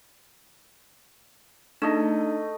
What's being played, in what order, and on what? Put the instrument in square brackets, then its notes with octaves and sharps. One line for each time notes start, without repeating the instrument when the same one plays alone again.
[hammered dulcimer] A3 D#5 [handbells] D4 D#4